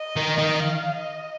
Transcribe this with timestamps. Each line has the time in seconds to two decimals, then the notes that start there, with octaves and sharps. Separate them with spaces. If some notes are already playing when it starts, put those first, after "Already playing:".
Already playing: D#5
0.16 D#3
0.38 D#3
0.62 F5
0.95 D#5